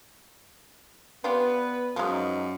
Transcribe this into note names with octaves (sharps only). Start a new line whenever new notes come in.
B3 D4 F4 G4 B4
F#2 F3 G#3
D#4